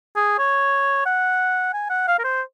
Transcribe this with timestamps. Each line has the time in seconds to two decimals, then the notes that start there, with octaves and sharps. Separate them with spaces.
0.16 G#4
0.38 C#5
1.06 F#5
1.73 G#5
1.90 F#5
2.07 F5
2.19 A#4
2.24 C5